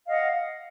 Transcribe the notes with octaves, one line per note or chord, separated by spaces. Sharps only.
D#5 F5 F#5